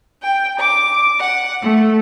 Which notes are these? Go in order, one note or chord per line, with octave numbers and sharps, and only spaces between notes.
G5
D6
F#5
A3